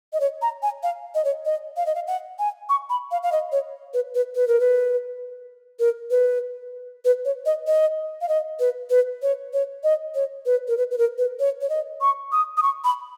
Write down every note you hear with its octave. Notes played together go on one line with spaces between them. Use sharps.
D#5
C#5
A#5
G#5
F5
D#5
C#5
D#5
F5
D#5
F5
F#5
G#5
C#6
B5
F5
F5
D#5
C#5
B4
B4
B4
A#4
B4
A#4
B4
B4
C#5
D#5
D#5
F5
D#5
B4
B4
C#5
C#5
D#5
C#5
B4
A#4
B4
B4
A#4
B4
C#5
C#5
D#5
C#6
D#6
D#6
C#6
B5